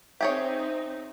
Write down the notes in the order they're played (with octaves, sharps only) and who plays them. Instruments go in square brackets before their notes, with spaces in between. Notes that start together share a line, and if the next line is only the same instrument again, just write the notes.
[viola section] C4 D#4 [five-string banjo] G4 G#4 C#5 [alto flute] C5 [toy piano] E5